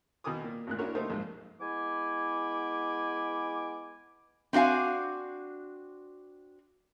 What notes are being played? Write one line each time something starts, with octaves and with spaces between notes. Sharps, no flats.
B2 D#3 A#4 G#5 D6 D#6
A#2 A#3
G#1 D2 A#2 A#3 F#6
C#4 D4 E4 F#4 A#4 C#5
A3 A#3 D#4 G4 A#4 C5
A#1 G#2
G#3 B3 E4 G#5 D6
C4 D4 F#4 F5 G#5